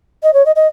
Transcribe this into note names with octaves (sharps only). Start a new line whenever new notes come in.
D#5
C#5
D#5
D#5